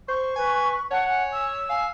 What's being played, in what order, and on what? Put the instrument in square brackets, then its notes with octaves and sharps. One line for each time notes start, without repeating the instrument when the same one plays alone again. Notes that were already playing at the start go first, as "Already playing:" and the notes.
[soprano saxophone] C5 [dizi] C#6
[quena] B4 [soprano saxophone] G#5
[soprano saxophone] C#5 [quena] F#5 [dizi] A5
[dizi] G#5
[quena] E6
[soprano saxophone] F5 [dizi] G#5